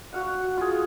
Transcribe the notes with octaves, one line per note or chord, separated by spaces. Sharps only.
F#4 F5 F#5
F4 G#4